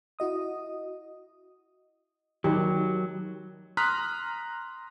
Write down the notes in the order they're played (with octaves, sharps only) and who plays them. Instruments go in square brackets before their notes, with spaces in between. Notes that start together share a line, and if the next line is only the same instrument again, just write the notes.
[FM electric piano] E4 F#4 D#5 D#6
[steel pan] D#3 G4 [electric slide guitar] F#3
[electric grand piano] A#5 C6 D#6 F6 F#6 B6